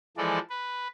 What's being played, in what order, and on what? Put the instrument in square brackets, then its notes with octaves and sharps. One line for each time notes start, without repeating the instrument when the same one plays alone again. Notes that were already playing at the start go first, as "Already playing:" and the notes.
[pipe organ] E3 F3 G#3 A4 D5
B4